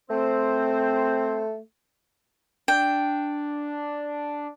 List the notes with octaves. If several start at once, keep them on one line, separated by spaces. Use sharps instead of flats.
A3 C4 C5
D4 G5